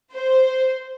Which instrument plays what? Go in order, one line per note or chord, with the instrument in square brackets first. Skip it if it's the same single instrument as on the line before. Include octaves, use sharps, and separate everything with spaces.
[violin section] C5